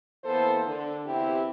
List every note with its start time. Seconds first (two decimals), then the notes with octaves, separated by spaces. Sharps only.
0.25 E3 A#3 B3 A4 C5
0.66 D3
1.06 E2 C4 E4 G4